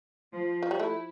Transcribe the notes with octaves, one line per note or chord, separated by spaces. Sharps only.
F3
F3
G3
A3 E4